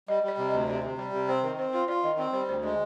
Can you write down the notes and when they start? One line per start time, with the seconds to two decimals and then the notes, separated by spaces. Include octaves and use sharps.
0.08 G3 D#5
0.23 G3
0.28 D5
0.38 C3
0.49 D2 D#5
0.68 C3 D5
0.83 C3
0.98 G3 D5
1.13 C3
1.28 C4 C5
1.43 D#3 A#4
1.59 C4 C5
1.73 F4 C5
1.88 F4 D5
2.03 D#3 D#5
2.18 C4 D5
2.33 G3 C5
2.48 D2 C5
2.63 G#3 D5